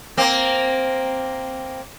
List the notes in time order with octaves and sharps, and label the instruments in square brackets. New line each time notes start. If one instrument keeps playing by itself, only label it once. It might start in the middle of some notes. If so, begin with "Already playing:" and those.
[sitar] A#3 C4